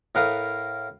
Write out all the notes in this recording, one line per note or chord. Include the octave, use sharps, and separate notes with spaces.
A2 A#4 B4 F5 D#6